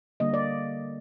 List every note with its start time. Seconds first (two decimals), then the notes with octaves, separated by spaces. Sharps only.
0.20 D3 G3 A#3 D#5
0.34 D5